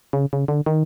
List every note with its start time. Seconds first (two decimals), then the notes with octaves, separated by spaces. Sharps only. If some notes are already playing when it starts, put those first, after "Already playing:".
0.13 C#3
0.33 C#3
0.48 D3
0.66 D#3